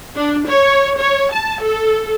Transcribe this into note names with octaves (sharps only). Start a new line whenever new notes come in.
D4
C#5
C#5
A5
A4